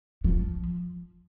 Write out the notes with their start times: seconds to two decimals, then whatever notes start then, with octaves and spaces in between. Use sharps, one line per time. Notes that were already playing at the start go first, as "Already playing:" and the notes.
0.24 F3